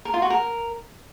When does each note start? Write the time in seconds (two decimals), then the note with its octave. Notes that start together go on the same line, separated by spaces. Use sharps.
0.05 A#4
0.14 F4
0.22 F#4
0.30 A#4